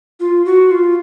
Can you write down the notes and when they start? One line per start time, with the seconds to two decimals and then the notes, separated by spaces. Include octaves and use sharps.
0.20 F4
0.46 F#4
0.71 F4